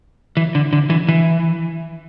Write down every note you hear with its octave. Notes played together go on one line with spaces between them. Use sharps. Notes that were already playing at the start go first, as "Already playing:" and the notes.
E3
D3
D3
E3
E3